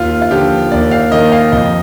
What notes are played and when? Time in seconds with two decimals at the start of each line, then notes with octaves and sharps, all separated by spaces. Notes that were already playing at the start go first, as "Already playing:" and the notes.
Already playing: D#2 F4
0.22 F4
0.31 D3 F3 G4
0.72 D#2 D5
0.91 F5
1.11 D#3 A#3 D#5
1.32 F5
1.52 F2 D#5